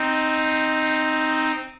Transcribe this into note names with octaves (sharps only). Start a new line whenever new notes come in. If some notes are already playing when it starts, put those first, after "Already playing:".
Already playing: C4 D#4